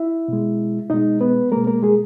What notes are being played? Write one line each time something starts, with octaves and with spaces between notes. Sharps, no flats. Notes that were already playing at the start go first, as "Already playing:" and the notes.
Already playing: E4 E5
B2 G#3
B2 G#3 D#4 D#5
B3 B4
B2 G#3 A#3 A#4
A#3 A#4
G#3 G#4